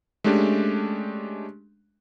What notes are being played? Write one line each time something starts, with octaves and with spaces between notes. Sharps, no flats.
G#3 A3 C#4 D4 G4